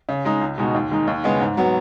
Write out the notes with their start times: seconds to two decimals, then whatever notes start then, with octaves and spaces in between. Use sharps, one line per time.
0.09 C#3
0.25 G#3 D#4
0.41 C#2
0.58 B2 G#3 D#4 F#4
0.74 D#2
0.91 D#3 G#3 D#4
1.07 D#2
1.24 C#3 G#3 B3
1.41 G#2
1.57 F#3 B3